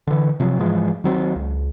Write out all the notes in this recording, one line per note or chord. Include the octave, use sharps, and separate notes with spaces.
D3 E3
C3 F3 F#3
G#2 E3 F3 G#3
D#3 F#3 C4
C#2